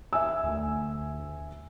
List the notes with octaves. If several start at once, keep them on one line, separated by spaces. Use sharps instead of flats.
E5 G#5 E6
D2